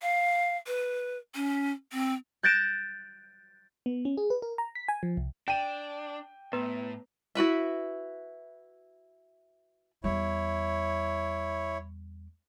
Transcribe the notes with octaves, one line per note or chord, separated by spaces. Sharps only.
F5
B4
C#4
C4
F#6 G6 A6 A#6 D7 E7
B3
C#4
G#4
B4
A#4
A#5
B6
G#5
F3
C2
D4 G5 D#7
A2 B3 B4 A#5
E4 F#4 B4 E5
E2 G3 E4 C#5